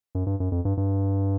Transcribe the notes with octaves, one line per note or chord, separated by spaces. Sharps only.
F#2
G2
F#2
F2
G2
G2